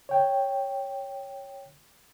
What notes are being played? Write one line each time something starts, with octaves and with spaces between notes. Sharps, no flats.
C#5 G5